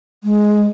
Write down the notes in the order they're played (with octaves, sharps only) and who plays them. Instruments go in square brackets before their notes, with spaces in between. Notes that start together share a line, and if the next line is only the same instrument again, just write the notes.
[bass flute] G#3